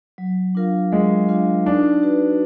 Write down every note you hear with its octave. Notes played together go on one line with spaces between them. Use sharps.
F#3
D4 F4 A#4 F5
F#3 G#3
D4 F4 A#4 F5
D4 D#4
F#4 B4